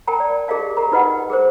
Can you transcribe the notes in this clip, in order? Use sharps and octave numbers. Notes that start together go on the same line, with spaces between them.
A#4 G5 A5 A#5
D5
G4 G#4 A#4 D#5 F5 A5
G4 A#4 A#5
D#4 F4 B4 D#5 F#5 G5
G#4 A#4 C5